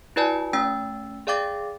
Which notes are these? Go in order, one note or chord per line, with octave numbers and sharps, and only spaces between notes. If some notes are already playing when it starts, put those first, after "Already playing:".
E4 F#4 B4 D5 G#5 A5
A3 C#4 G5 E6 A6
G#4 D5 F5 G5 D6 A6